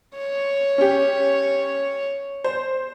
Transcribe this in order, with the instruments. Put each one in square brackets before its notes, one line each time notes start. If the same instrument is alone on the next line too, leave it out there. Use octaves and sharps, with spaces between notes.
[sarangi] C#5
[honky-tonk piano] C#4 G4
C5